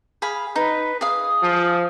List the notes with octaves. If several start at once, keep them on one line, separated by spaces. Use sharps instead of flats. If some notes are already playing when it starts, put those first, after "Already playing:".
G#4 F5 B5
D#4 B4
G#4 F5 D#6
F3